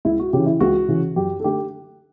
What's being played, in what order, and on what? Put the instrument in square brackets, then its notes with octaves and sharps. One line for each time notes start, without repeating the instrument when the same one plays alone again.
[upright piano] C#2 E4
F#4
C#3 E3 G4
E4
C#2 F#4
C#3 E3
F#2 G4
A4
D3 A3 G4